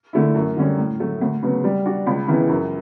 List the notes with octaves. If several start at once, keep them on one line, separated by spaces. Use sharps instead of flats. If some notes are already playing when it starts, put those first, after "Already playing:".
D3 A3 E4
F#2
D3 G3 C#4
A2
F#3 A3
D2
C#3 F#3 B3
G3
D4 F#4
C#2
C#3 E3 B3
F#2